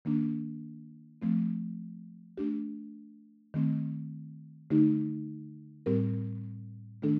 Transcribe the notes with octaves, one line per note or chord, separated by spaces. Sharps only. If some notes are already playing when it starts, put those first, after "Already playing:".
D#3 A#3 D4
F3 A3 C4
A3 D4 G4
D#3 A3 C4
D3 A3 D#4 G4
A2 G3 C4 G4 A#4
D#3 A3 D4 A4